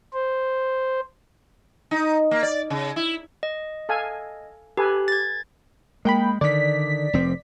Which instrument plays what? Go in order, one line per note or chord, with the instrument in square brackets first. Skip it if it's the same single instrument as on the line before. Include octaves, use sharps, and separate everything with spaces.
[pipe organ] C5
[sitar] D#4
A#3
D5
C#3
E4
[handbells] D#5
[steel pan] A4 F5 G#5
[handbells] G4 [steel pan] A4 B4 G#5
[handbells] G#6 A6
[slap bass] G#3 [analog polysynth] A#3 G5 B5
[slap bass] D3 D#3 [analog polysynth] D5 B6
[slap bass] F1 F3 C4